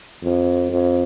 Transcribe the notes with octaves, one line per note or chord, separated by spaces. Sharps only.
F2
F2